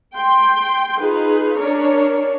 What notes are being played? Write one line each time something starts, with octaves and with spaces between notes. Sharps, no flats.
G5 C6
D#4 F4 G#4 B4
C#4 D4 A#4 C#5